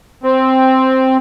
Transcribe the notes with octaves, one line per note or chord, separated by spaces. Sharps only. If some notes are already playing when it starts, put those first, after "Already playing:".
C4